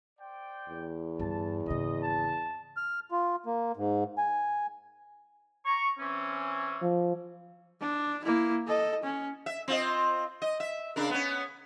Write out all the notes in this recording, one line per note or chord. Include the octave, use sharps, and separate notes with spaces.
C5 D5 G5
E2
G2 D3 A5
G#1 C#3 D#5
A5
F6
F4
A#3
G#2
G#5
A#5 C#6
E3 C4 C#4
F3
D4
A#3 E4
A4 D#5
C#4
E5
C4 F4 D#5
D#5
E5
C#3 D4 A#4
B3 C#4